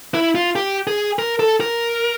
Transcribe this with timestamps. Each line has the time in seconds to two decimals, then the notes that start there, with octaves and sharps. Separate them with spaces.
0.14 E4
0.35 F4
0.56 G4
0.87 G#4
1.19 A#4
1.39 A4
1.60 A#4